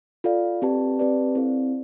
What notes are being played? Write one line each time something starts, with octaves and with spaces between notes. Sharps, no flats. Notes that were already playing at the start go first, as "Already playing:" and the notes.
F4 A4 D5 F5
C4 G4 B4 D5 A5
C4 G4 B4 D5 A5
C4 E4 A4 C5 F5